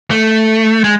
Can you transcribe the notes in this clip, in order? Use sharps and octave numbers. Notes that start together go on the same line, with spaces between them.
A3
G#3